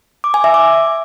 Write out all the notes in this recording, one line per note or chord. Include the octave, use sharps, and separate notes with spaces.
D6
G#5
E5
D6